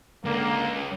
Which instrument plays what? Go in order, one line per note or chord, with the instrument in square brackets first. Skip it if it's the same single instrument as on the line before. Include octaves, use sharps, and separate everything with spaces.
[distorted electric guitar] C#2 [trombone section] D3 A#3